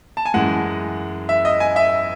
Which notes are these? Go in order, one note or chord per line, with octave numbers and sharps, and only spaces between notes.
A5
G#5
F#2 E3 G#3 F#5
E5
D#5
G#5
E5